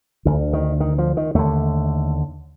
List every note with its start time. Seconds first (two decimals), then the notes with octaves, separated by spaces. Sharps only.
0.25 D2 D3
0.53 D#3
0.80 D#3
0.98 F3
1.17 D#3
1.35 D#2 D3 A3